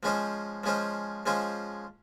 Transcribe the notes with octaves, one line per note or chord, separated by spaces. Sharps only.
F3 G#3 C#4 F4 C5
F3 G#3 C#4 F4 C5
F3 G#3 C#4 F4 C5